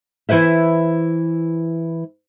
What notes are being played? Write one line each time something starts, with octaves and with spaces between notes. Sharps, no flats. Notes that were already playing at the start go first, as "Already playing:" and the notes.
E3 E4 B4 C5 E5